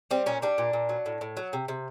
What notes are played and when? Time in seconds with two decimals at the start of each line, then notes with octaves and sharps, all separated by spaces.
0.11 G3 C4
0.26 A#2 C#4
0.42 G3 D4
0.58 A#2
0.73 A#2
0.89 F#3
1.06 A2
1.21 A2
1.37 F#3
1.53 C3
1.68 C3